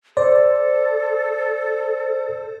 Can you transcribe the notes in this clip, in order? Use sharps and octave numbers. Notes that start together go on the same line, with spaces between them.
A4 C5 D5